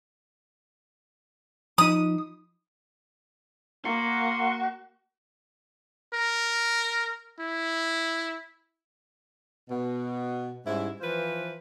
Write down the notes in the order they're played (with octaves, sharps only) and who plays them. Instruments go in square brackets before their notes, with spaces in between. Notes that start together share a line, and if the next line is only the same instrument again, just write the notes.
[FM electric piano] F3 D#4 [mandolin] D#6
[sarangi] A#3 [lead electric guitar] F#4 [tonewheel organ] C6 C#6
[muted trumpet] A#4
E4
[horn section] B2
G#2 G3 C#4 E4
E3 F3 F4 B4 C5